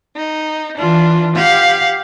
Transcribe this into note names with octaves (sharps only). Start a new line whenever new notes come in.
D#4
E3 D4 F4
G4 F5 F#5